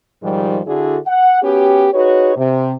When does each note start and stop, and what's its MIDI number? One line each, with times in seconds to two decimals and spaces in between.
0.23 0.60 44
0.23 0.60 51
0.23 0.60 53
0.23 0.60 55
0.67 0.98 50
0.67 0.98 62
0.67 0.98 64
0.67 0.98 66
0.67 0.98 68
0.67 0.98 69
1.07 1.39 78
1.42 1.88 59
1.42 1.88 61
1.42 1.88 66
1.42 1.88 67
1.93 2.34 63
1.93 2.34 66
1.93 2.34 68
1.93 2.34 71
1.93 2.34 73
2.37 2.73 48